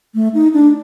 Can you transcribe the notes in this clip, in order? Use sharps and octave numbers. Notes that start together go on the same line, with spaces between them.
A3
D#4
D4